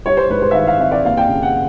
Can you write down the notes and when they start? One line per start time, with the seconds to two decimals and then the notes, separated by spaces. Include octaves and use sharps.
0.05 G3 C#5
0.17 C5
0.30 G#2 B4
0.42 C5
0.51 E5
0.55 D#3 F5
0.67 F5
0.79 C4 E5
0.92 D5
1.05 A#3 F5
1.17 G5
1.29 C#3
1.42 F#5